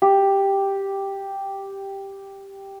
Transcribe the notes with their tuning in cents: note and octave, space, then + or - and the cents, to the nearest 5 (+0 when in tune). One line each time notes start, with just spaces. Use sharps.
G4 +0